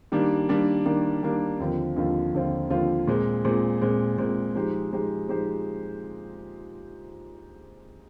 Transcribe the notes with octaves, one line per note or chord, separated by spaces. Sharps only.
D#3 G3 A#3 D4
D#3 G3 A#3 D4
D#3 G3 A#3 D4
D#3 G3 A#3 D4
D#2 D3 F3 C4 F4
D#2 D3 F3 C4 F4
D#2 D3 F3 C4 F4
D#2 D3 F3 C4 F4
A#2 G#3 C4
A#2 G#3 C4
A#2 G#3 C4
A#2 G#3 C4
F3 G#3 D#4 G4 C5
F3 G#3 D#4 G4 C5
F3 G#3 D#4 G4 C5